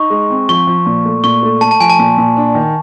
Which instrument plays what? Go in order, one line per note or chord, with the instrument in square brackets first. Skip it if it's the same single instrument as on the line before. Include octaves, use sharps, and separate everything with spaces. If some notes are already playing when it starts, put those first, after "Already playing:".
Already playing: [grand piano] D#4 [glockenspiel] C#6
[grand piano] G#3
C4
[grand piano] F3 [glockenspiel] C#6
[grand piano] F3
A#2
A3
[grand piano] A#2 [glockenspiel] C#6
[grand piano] A3
[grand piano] A3 [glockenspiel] A5
[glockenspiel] A5
[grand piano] F3 [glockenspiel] G#5
[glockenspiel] A5
[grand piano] A#2
A#2
D4
D#3